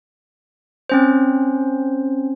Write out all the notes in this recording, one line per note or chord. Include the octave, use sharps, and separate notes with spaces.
C4 C#4 C5